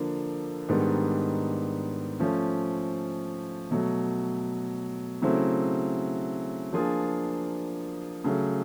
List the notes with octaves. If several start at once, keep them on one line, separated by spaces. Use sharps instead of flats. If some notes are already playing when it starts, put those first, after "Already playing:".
Already playing: D3 F3 A#3 D4
G#2 D#3 G3 B3 D4
F3 A3 C#4
B2 F#3 A3
C#3 F#3 A3 C4 E4
F3 A#3 D4 F4 G#4
C#3 F#3 A3